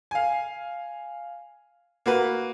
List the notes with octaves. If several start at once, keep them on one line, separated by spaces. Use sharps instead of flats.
F5 G#5
A#3 F#4 B4